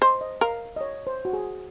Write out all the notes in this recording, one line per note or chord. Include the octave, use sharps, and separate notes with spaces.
C5 D#5
D#5
A#4 F5
D#5
C#5
C5
F#4
G#4